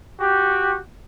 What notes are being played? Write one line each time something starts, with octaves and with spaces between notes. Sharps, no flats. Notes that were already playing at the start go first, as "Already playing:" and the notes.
F#4 G4